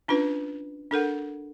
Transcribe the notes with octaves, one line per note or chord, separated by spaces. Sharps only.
C#4 D4 F4 B4
D4 A4 A#4 F#5